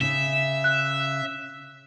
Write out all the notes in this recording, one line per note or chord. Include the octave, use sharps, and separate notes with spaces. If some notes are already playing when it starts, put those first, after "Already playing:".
C#3 E5
F#6